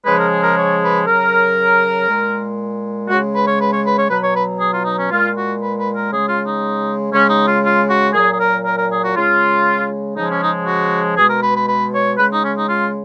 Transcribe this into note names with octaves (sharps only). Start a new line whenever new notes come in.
C#3 F3 G#3 B4
A#4
G#4
A#4
C#5
B4
C#3 F#3 A#4
A#2 G#3
C#3 G#3 F#4
B4
C#5
B4
C#5
B4
C#5
B2 F#3 B4
C#5
B4
G#4
F4
D#4
C#4
A#2 G#3 F4
F#4
B4
B4
A#4
C#3 G#3 G#4
F4
D#4
C#3 G#3 C#4
D#4
F4
F4
F#4
A#2 F#3 G#4
G#4
A#4
A#4
A#4
G#4
F#4
C#3 G#3 F4
C#3 F3 G#3 D#4
C#4
D#4
F#4
B2 G#3 G#4
A#4
B4
B4
B4
C#5
C#3 G#3 B4
D#4
C#4
D#4
F4